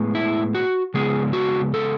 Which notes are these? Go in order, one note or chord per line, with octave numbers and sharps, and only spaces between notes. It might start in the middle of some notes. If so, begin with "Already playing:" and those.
Already playing: A2 G#3 B3
E4
F#4
C#3 G#3 B3 G#4
F#4
A4